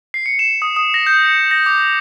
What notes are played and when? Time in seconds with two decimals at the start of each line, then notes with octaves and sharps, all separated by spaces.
0.14 C7
0.26 C#7
0.39 E7
0.62 D#6
0.76 D#6
0.94 A#6
1.07 G6
1.26 C#7
1.51 A#6
1.66 D6